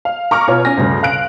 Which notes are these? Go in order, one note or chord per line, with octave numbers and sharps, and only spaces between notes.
F5
A#5 C#6 D6 F6
B2 F4 C#5
C#4 G#5 A#6
D2 G2 C#3
F5 F#6 D7